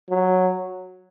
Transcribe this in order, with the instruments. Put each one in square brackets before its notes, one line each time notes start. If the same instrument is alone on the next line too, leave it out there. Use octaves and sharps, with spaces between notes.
[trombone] F#3